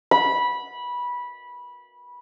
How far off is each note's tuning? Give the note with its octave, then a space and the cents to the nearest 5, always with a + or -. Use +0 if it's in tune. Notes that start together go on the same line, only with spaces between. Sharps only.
B5 -15